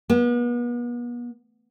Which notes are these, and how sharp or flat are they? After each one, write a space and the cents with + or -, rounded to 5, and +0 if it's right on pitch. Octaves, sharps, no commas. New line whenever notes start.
B3 -40